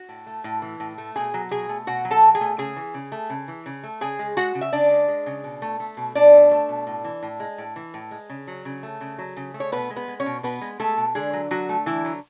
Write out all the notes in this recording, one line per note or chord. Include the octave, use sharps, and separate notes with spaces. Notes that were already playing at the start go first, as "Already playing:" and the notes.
Already playing: F#4
A2
A3
A2
E3
A2
A3
B2 G#4 G#5
F#3
B2 G#4 G#5
A3
B2 F#4 F#5
F#3
A4 A5
B2
G#4 G#5
A3
C#3 G#4 G#5
E3
C#3
A3
C#3
E3
C#3
A3
C#3 G#4 G#5
G#3
G#3 F#4 F#5
C#3
E5
C#3 D4 D5
G#3
G#3
C#3
B2
A3
A3
B2
B2 D4 D5
A3
A3
B2
A2
E3
A2
G#3
A2
E3
A2
G#3
C#3
F#3
C#3
A3
C#3
F#3
C#3
A3
C#5
B2 B3 B4
G#3
B3 B4
G#3
C#4 C#5
B2
B2 B3 B4
G#3
G#3 A3 A4
B2
D3 G#3 G#4
F#3
D3 F#3 F#4
A3
D3 E3 E4
F#3